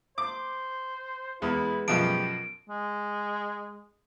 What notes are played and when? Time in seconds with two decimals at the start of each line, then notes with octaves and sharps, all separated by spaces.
0.18 C5 D6
1.42 E2 G#3 B3 E4
1.88 F#2 B2 F3 G4 D7
2.69 G#3